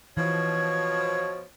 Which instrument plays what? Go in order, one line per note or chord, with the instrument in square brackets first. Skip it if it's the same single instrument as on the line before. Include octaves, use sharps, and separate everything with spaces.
[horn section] B2 F3 [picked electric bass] E3 [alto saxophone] C#5 [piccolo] G#6